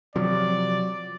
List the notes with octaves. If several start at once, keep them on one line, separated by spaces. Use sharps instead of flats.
C3 F3 F#3 D5